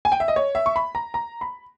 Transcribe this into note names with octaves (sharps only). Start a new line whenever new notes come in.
G#5
G5
E5
D#5
C#5
E5
C#6
B5
A#5
A#5
B5